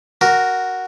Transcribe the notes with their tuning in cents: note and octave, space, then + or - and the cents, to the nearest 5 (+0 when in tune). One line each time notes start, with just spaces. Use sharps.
F#4 +0 A#4 +0